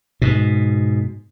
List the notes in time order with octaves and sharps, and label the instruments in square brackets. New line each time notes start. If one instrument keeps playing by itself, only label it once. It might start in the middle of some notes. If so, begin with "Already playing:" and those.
[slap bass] G#2 B2